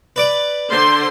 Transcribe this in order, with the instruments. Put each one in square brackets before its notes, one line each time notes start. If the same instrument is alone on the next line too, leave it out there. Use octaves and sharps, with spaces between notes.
[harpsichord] B4 D5 D6
[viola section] D3 C5 C6